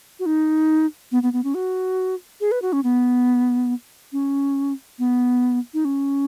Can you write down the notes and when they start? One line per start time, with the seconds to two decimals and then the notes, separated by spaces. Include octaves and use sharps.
0.19 F#4
0.26 D#4
1.12 B3
1.23 B3
1.33 B3
1.44 C#4
1.55 F#4
2.41 G#4
2.51 B4
2.62 F#4
2.73 C#4
2.84 B3
4.12 C#4
4.99 B3
5.74 D#4
5.85 C#4